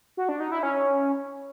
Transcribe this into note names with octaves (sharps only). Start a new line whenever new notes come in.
F#4
D4
D#4
E4
C#4